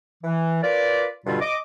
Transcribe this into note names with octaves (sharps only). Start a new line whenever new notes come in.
E3
F4 A#4 B4 D5
G2 B2 D3 G3 F4
D#5 D6